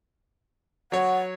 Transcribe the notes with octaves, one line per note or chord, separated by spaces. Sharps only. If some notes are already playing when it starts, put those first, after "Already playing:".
F#3 C#5 F#5